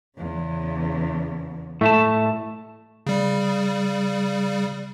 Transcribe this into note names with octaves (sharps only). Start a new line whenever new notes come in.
E2 C#3
A2 A3 E5 A5
C#3 G3